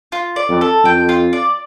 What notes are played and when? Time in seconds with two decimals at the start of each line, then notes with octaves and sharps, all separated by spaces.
0.12 F4
0.36 D5
0.49 F2
0.61 A4
0.84 F2 G5
1.09 F4
1.33 D5